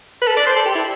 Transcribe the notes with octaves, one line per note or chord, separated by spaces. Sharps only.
B4
A4
D5
C5
A4
G4
E4